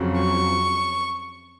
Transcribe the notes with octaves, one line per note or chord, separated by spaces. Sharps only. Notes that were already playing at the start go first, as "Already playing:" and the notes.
Already playing: F2 C#3 F#3
C#6